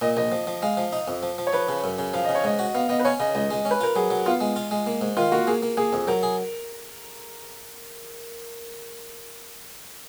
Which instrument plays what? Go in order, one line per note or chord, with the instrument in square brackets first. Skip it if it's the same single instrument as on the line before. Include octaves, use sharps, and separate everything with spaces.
[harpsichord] A#2 [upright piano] D#5
[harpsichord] A#1 [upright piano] D#5
[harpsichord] F3
F3
[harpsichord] G#3 [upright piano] F5
[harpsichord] F3
D#4
F2
F3
F3
[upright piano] C#5
[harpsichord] F3 [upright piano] B4
[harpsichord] C#3
F#2
C#3
[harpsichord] F3 [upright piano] F5
[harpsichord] C#3 [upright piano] D#5
[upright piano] C#5
[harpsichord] G#2 [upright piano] D#5
[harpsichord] F#4
[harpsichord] B3 [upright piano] F5
[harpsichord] B3 [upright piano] D#5
[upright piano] B4
[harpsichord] C#4 [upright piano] C#5
[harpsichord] C#3 [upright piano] D#5
[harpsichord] C#2 [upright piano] D#5
[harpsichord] G#3
C#4
[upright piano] B4
[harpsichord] F4 [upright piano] A#4
[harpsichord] F#3 [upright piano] G#4
[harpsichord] F#3
[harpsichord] B3 [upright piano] F4
[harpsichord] G#3
F4
G#3
A#3
G#2
[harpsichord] D#3 [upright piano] F4
[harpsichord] A#3 [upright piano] F#4
[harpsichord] A#3 [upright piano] G#4
[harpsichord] A#3
[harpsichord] A#3 [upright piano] G#4
[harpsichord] F2
[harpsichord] F#3 [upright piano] A#4
[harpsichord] G#4